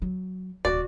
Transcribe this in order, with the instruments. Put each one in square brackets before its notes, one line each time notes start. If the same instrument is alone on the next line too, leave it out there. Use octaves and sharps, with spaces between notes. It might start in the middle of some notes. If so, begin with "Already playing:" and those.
[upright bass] F#3
[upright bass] D1 C3 [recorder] F#4 [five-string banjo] D5